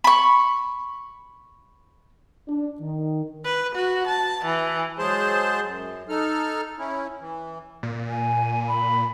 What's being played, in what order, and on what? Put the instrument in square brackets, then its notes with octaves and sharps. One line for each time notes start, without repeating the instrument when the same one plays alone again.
[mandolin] B5 C#6
[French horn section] D4
D#3
[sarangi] B4
F#4
A5
E3
[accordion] F#3 G#3 G#4 C5 A5 C6
F#2
D#4 A4 F6
C#4 E4
E3
[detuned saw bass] A#2
[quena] G#5
B5